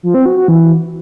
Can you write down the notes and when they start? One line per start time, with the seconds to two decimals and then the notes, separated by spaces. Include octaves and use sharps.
0.03 F3
0.14 C4
0.26 F#4
0.37 F#4
0.48 E3